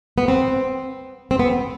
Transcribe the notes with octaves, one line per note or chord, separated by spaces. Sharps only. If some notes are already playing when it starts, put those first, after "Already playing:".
B3
C4
C4
B3